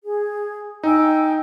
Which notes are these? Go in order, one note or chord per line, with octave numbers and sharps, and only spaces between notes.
G#4
D#4 G5 G#5 E6